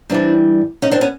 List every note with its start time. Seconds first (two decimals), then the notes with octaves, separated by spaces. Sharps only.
0.10 G2 E3 G3 C4 D4
0.82 C#4 D#4
0.91 C4 D4
1.01 B3 C#4